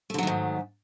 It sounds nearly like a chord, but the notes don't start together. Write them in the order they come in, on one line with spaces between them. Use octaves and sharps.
A3 D3 F#3 D#3 G#2